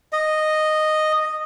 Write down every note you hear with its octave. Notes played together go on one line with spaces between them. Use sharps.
D#5